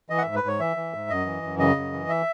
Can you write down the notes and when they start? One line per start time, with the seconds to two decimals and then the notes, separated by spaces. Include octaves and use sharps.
0.10 E3 D#5
0.18 F#5
0.22 G#2 E5
0.35 B4
0.43 G#2 C#5
0.60 E3 E5
0.76 E3
0.93 G#2
1.09 F#2 D#5
1.26 E3
1.43 F#2
1.59 C#3 D#5
1.76 F#2
1.93 E3
2.09 E5